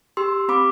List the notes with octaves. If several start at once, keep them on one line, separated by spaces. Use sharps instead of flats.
G4 C6 E6
C4 B5 D6